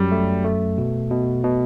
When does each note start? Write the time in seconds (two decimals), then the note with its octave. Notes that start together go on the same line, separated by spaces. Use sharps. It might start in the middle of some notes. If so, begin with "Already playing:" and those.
Already playing: F#2 F#3 G3
0.11 A3
0.44 A3
0.78 B2
1.11 B2
1.44 B2